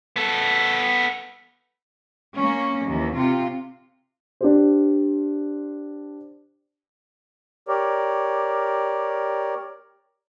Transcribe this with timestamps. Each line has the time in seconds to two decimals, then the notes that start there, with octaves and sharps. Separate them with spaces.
0.16 B3 A4
2.38 A#3 C#4
2.87 D#2 E3
3.16 C3 F4
4.41 D4 G4 C5
7.68 G4 A#4 C#5 D5